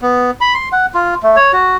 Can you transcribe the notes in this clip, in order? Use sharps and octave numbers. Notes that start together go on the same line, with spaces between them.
B3
B5
C6
F#5
F4
A3
C#5
F#4